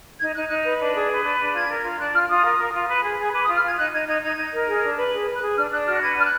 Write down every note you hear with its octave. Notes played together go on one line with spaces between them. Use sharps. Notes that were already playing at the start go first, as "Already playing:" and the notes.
D#4 G#6
D#4 F#6
D#4 F#6
B4
D4
G#4
B4
D4
D4
F4 G#6
A#4
F4
D4 F#6
F4 F6
F4 D#6
A#4
A#4
F4
B4
G#4
G#4
B5
B4 D6
D#6
F4
F6
F4 G#6
D#4 F#6
D#4 G#6
D#4 G#6
D#4 G#6
D#4
A#4
G#4
D4
B4
G#4
B4
F#6
G#4
D4 F6
D4 F#6
F#4 F6
F#6
B4 G#6
D4 F6
F#6